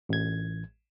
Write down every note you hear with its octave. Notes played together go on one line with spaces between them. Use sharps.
A1 G#6